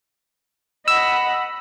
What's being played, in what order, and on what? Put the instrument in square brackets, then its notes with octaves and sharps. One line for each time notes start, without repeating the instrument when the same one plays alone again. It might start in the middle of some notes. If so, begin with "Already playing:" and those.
[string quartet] D#5 F#5 B5 [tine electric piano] E6